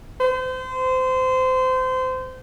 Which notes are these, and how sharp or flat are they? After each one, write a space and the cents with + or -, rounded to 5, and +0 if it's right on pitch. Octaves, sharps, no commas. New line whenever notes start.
C5 -25